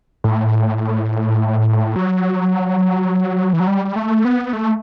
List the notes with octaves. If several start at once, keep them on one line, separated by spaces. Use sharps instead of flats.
A2
F#3
E3
F#3
G3
A3
B3
A3